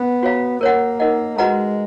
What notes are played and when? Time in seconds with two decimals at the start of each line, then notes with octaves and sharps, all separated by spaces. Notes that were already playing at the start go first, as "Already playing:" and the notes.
Already playing: B3
0.23 F#4 C#5 F5 A#5
0.61 A#3 A#4 C#5 F#5
1.00 D#4 A#4 D#5 F#5
1.38 G#3 F#4 B4 D#5 F#5 A#5